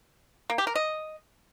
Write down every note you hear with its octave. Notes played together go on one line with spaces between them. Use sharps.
A#3
G4
A#4
D#5